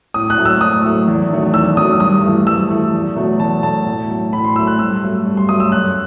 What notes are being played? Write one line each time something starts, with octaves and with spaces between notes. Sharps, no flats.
A2 D#6
F#6
F#3 A3
E6
A2 D#6
F#3 A3
E2
D#3 F#3 A3
E2 E6
D#3 F#3 A3 D#6
G2 D#6
E3 A3
G2 E6
E3 A3
E2
B2 F#3 A3
E2 A5
B2 F#3 A3 A5
A2
F#3 A3
A2 B5
C6
F#3 A3 E6
F#6
G2 E6
F#3 A3
G2
C6
F#3 A3 D#6
E6
F#2 F#6